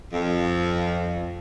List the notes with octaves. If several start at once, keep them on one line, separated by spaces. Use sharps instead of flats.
F2